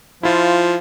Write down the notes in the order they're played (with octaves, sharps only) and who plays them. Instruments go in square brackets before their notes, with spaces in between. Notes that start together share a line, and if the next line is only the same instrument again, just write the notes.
[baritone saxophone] F3 [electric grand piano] E4 F4